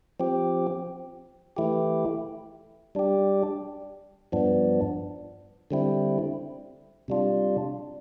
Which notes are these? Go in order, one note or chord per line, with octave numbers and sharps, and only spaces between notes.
F3 C4 G4
E3 A3 E4 G4
G3 D4 G4
G2 F3 B3 D4
D3 G3 C4 E4
C3 G3 D4 F4